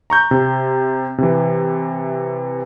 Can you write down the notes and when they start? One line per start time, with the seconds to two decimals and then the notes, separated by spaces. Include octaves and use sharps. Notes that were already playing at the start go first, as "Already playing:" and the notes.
0.10 A#5 C#6 G6
0.31 C3
1.18 C3 E3